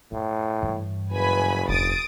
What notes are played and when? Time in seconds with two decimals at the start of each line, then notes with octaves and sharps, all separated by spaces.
0.12 F#2 A2
0.62 G2 E3
1.10 F#1 B4 G#5 B5
1.69 E1 D4 D#6 A6 D7